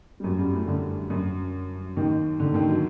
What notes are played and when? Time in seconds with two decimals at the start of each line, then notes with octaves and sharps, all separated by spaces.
0.20 G3
0.24 F#2 F#3
0.39 G2 G3
0.53 A2 A3
0.68 D3
1.10 F#2 F#3
1.97 D#2 D#3
2.40 D3
2.54 D#2 D#3
2.69 F#3